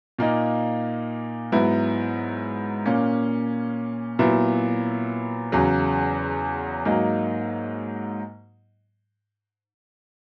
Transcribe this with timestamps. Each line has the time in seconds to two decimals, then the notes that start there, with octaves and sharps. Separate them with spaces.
0.19 A#2 A#3 D#4
1.52 G#2 F#3 B3 E4
2.86 A#2 A#3 C#4
4.19 A#2 F#3 B3 E4
5.52 E2 C#3 F#3
6.85 G#2 F#3 A#3 D#4